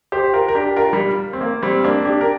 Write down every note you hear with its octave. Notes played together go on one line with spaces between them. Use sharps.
G4 C5
F4 A#4
A#4
D4 G4
F4 A#4
G3
C4
A#3
G3 C4
A#3 D4
D4 G4
A#4